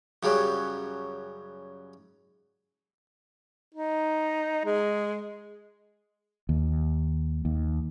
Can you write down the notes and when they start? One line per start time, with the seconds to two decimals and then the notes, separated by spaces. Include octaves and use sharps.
0.23 F#2 C#3 F#3 G3
3.74 D#4
4.65 G#3
6.49 D#2
7.45 D#2